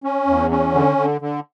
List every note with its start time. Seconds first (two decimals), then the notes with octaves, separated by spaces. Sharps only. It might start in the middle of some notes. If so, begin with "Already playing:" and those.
0.04 C#4
0.27 E2
0.51 C#4
0.74 D3
0.97 D3
1.21 D3